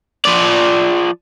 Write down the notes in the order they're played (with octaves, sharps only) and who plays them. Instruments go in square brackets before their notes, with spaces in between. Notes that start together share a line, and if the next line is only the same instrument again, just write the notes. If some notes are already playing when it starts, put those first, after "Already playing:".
[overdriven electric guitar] F3 D5